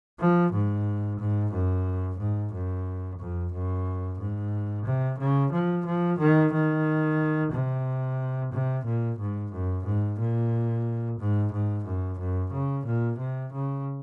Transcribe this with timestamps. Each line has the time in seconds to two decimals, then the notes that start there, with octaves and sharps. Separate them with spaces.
0.20 F3
0.53 G#2
1.19 G#2
1.53 F#2
2.19 G#2
2.53 F#2
3.19 F2
3.53 F#2
4.19 G#2
4.86 C3
5.19 C#3
5.52 F3
5.86 F3
6.19 D#3
6.53 D#3
7.52 C3
8.52 C3
8.85 A#2
9.19 G#2
9.52 F#2
9.85 G#2
10.19 A#2
11.19 G#2
11.52 G#2
11.86 F#2
12.19 F#2
12.52 C#3
12.86 A#2
13.19 C3
13.53 C#3